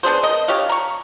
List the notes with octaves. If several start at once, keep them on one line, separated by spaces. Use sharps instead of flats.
B3 D4 G#4 C5
A#4 D#5
D4 G4 C#5 F5
A#5 C#6